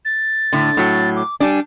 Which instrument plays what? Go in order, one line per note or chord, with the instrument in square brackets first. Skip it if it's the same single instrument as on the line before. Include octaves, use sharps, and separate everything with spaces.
[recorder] A6
[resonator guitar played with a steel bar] A2 D3
A2 F#3
[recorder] D6
[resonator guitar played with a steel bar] G3 D4 [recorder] G#5